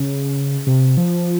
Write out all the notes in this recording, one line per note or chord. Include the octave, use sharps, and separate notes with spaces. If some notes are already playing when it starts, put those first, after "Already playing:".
Already playing: C#3
C3
F3